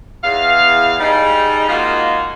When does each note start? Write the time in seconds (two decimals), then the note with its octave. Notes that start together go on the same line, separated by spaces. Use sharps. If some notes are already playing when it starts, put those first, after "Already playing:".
0.23 E2 F5
1.00 G3 G#3 D#4
1.68 G#3 A#3 D#4 F4 F#4